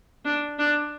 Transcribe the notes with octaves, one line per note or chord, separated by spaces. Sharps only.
D4
D4